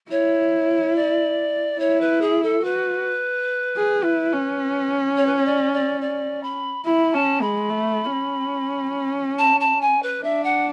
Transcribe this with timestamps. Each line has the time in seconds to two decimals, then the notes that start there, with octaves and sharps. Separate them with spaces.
0.10 E4 C#5
0.95 D5
1.79 E4 C#5
2.00 B4
2.21 G#4
2.43 A4
2.64 F#4 B4
3.76 G#4
4.04 E4
4.32 C#4
5.17 C#5
5.26 B4
5.36 C#5
5.45 D5
5.73 D5
6.01 D5
6.43 B5
6.85 E4 B5
7.13 C#4 A5
7.41 G#3 B5
7.70 A3
8.12 C#4
9.38 A5
9.60 A5
9.81 G#5
10.02 B4
10.23 D4 E5
10.43 F#5